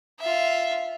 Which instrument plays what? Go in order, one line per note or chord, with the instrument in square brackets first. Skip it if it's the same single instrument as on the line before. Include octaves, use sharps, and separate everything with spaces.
[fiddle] F4 E5